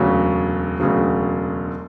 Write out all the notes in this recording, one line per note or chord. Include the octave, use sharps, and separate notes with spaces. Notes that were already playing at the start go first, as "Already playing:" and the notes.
Already playing: E1 D2 C#3 F#3
E1 D2 C#3 F#3